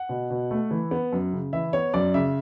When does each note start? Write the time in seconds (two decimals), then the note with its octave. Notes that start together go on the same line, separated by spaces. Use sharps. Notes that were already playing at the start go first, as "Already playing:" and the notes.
Already playing: F#5
0.09 B2
0.30 B2
0.51 A3
0.71 E3
0.91 B3
1.13 F#2
1.33 C#3
1.53 E3 E5
1.73 B3 C#5
1.94 F#2 D5
2.14 C#3 E5